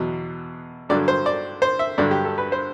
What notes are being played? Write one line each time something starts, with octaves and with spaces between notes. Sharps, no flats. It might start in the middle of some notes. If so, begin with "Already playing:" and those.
Already playing: E2 B2 F#3
G2 D3 F#3 D5
C5
D5
C5
E5
G2 D3 F#3 D5
G4
A4
B4
C5